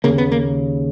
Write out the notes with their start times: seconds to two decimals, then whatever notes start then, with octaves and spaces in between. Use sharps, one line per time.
0.04 D#2 C#3 A#3
0.18 B3
0.32 A#3